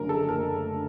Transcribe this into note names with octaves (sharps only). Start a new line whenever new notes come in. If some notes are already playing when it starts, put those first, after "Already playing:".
Already playing: F#1 F#2 D3 A#4
A4
F#1 A#4
D3